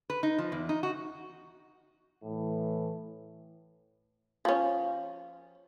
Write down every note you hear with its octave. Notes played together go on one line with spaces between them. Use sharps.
B4
D#4
F3
E2
D#4
F#4
A2 E3
F3 C#4